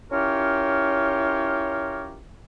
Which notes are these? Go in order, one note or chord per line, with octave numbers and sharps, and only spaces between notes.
C#4 E4 F4 G4 A#4 C#5